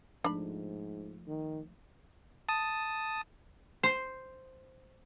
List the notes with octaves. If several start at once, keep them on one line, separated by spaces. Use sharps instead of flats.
G#2 F3 A3 D4 B5
D#3
A5 D#6
C5